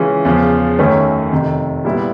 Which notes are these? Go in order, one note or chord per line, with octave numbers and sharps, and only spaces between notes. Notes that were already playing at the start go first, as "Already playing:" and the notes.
Already playing: C#3 E3 G#3 C#4 F4
E2 C#3 F3
F#2 D#3 F#3 A3 C#4
F2 C3 D#3
A#2 G3 B3 E4